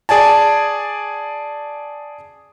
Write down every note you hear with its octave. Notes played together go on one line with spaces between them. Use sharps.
G#4 D5 G#5 A5